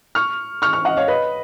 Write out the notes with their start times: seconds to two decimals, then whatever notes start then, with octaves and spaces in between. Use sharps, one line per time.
0.15 C#6 F6
0.62 C#6 F6
0.73 C#6 F6
0.85 D#5 F#5
0.97 C#5 F5
1.08 B4 D#5